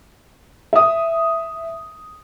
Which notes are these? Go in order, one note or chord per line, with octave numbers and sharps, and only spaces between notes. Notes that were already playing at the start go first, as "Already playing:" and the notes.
E5 D#6